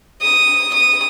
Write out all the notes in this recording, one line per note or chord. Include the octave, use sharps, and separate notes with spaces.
D#6
D#6